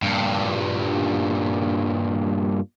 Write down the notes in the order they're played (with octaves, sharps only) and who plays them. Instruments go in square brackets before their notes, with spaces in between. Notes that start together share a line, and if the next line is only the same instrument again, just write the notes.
[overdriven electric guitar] G2 A#2